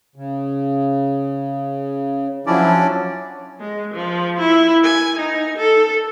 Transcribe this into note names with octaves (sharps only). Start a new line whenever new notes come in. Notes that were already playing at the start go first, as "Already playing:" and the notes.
C#3
F3 F#3 C#4 D4 E4 D5
G#3
F3
E4
G#5
D#4
A4